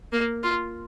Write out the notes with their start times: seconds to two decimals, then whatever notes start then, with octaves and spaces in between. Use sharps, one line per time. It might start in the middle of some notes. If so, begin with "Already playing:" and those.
0.13 A#3
0.43 F4